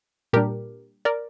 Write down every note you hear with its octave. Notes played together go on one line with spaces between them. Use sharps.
A#2 G3 D4 G4 A#4
A#4 D5